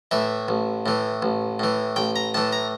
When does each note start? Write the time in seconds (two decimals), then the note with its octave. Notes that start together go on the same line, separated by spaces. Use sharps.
0.11 A2 E3 E5
0.48 A1
0.86 A2 E3
1.22 A1
1.59 A2 E3
1.96 A1 G5
2.16 A#5
2.34 A2 E3 A5
2.52 A#5